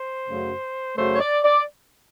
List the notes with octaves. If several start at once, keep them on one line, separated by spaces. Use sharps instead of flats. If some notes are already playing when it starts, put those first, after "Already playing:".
Already playing: C5
F#2 C#3 F#3 A3
F#2 C#3 F#3 A3 C5
C#5
D5
D5